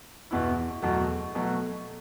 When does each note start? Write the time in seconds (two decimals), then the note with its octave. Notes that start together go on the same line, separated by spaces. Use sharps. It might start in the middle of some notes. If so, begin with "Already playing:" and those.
0.31 E2 B2 B3 E4
0.82 E2 B2 F#3 A3
1.35 B2 F#3 A3